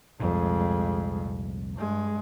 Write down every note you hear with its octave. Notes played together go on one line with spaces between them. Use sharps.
F1 C2 F2 A#2 G#3
G2 G#3